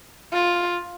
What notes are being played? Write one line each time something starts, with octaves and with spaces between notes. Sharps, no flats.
F4